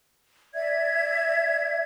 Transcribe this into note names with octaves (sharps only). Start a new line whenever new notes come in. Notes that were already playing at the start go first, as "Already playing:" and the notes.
D5 E5 G#6